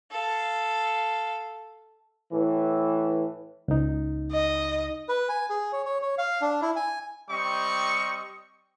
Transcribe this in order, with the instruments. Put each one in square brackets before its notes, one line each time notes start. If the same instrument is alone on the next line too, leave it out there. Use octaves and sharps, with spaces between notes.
[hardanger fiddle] A4 F5
[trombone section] A2 E3
[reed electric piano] C#2 D#4
[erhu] D#5
[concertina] B4
G#5
G#4
C#5
C#5
C#5
F5
D4
E4
G#5
[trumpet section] G3 C4 D#5 C#6